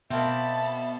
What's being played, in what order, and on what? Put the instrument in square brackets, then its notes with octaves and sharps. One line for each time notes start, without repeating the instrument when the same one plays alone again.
[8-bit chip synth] B2 [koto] A#3 C4 [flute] E5 [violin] A5 B5